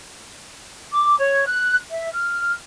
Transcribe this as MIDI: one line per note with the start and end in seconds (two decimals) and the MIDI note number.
0.93 1.16 86
1.19 1.44 73
1.46 1.77 90
1.90 2.11 76
2.13 2.52 89